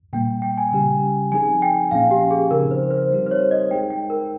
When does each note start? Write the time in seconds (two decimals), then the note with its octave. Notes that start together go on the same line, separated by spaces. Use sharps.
0.13 A#2 G3 A#3 G5
0.42 G5
0.58 G#5
0.72 C#3 G3 C#4 G4
1.31 F3 C4 D#4 G#4 G#5
1.62 G5
1.91 A#2 F3 A#3 C#4 F5
2.11 G4
2.31 G#4
2.51 C#3 F3 C4 D#4 A#4
2.71 C5
2.91 C5
3.11 G3 C4 D#4 G4
3.27 C5
3.31 C#5
3.51 D#5
3.71 G#3 D#4 G#4 G5
3.90 G5
4.10 A#4